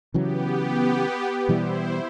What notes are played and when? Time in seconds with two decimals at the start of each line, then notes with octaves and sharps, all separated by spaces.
0.14 C#3 E3 F#3 B3 G4
1.49 B2 E3 G3 E4 C5